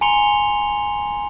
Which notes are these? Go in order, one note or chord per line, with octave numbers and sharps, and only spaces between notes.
G#5 A#5 C6 C#7 F7 G7